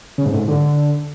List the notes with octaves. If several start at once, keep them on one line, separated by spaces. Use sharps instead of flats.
C#3
G#2
A2
G#2
D3